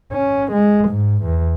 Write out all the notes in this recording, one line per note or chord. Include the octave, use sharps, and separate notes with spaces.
C#4
G#3
G#2
E2